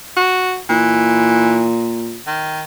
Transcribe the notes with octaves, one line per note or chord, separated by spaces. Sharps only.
F#4
A#2 E3
D#3